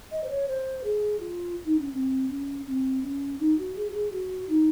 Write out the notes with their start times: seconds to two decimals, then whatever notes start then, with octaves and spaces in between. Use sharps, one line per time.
0.12 D#5
0.24 C5
0.29 C#5
0.48 C5
0.84 G#4
1.20 F4
1.66 D#4
1.79 C#4
1.93 C4
2.29 C#4
2.67 C4
3.03 C#4
3.40 D#4
3.58 F#4
3.76 G#4
3.90 F#4
3.94 G#4
4.12 F#4
4.49 D#4